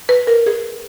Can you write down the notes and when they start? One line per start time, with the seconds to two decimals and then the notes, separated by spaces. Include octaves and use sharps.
0.09 B4
0.27 A#4
0.46 G#4